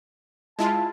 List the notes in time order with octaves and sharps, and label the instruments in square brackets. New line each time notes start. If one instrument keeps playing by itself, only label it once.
[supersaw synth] G#3 E4 F4 [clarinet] A5